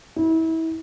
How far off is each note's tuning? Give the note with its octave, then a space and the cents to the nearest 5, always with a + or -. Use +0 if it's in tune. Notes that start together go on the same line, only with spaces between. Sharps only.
E4 -30